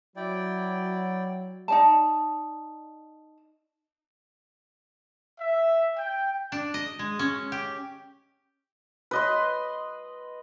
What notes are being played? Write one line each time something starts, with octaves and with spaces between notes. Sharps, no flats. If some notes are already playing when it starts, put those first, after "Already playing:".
F#3 E4 D5 G5
D#4 D5 A5
E5
G5
D4
D#5
G#3
C#4
G4
B4 D#5 C6